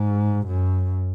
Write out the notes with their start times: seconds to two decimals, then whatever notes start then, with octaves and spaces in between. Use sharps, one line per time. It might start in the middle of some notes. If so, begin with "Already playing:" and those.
Already playing: G#2
0.47 F#2